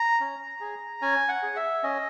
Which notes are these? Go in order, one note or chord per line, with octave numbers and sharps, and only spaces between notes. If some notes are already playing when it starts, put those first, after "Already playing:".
Already playing: A#5
C#4
G#4
C#4 G#5
F#5
G#4
E5
C#4 D#5